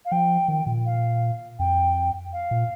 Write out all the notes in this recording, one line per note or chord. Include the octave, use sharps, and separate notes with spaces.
F5
F3 G5
D#3
A#2
F5
F2 G5
F5
A#2